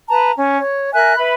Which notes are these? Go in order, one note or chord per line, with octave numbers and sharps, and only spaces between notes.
B4 A5 A#5
C#4
C#5
A#4 E5 G#5 F#6
B4 E5 B5